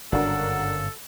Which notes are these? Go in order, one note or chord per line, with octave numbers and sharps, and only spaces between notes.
G1 G#2 C#3 D4 F#4 A4 A#4